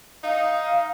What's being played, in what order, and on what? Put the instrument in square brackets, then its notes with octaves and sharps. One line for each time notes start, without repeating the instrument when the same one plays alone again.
[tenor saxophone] D#4 [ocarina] F5